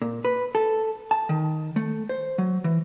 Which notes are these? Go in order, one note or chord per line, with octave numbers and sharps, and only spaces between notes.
A#2
B4
A4
A5
D#3
A3
C5
F#3
E3